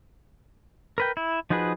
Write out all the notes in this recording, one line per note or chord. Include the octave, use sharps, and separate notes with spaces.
A#4 B4 G5
E4
F3 D#4 F#4 G#4 B4